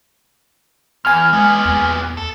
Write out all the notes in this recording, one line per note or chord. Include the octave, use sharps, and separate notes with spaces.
E2 G#5 F6
A#2 G#3 B3
E2
A4